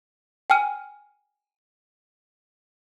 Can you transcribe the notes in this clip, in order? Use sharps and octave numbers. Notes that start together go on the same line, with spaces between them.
G5 G#5 F6 D#7